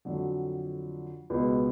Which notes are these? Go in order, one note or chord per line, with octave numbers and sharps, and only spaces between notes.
F2 D3 F#3
C#2 B2 G#3 B3